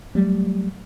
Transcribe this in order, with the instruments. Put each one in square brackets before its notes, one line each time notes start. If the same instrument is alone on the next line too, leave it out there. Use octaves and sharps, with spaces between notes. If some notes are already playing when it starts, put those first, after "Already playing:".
[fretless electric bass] F#3 G3 A3